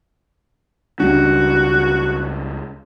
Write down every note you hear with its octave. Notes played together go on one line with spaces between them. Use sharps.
C#2 G3 D4 F#4